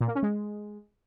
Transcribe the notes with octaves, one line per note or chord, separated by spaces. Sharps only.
A#2
A#3
C#4
G#3